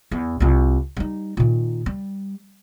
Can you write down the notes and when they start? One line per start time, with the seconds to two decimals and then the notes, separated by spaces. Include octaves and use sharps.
0.11 E2
0.40 C2 F4
0.97 G3 D#4
1.37 A#2 D#3
1.86 G3